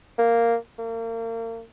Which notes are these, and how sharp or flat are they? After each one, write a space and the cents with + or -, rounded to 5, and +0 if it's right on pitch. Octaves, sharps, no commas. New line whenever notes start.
A#3 -5
A#3 -35